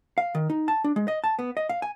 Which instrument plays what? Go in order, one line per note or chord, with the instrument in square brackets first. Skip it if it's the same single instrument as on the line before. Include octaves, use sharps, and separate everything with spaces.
[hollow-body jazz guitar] F5
D#3
D#4
A5
D4
G#3
D#5
A5
B3
D#5
F5
G#5